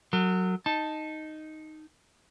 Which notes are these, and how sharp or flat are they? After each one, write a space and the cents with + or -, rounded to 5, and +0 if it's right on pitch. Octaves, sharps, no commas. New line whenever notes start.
F#3 +0 A#4 -40
D#4 +0 A5 +5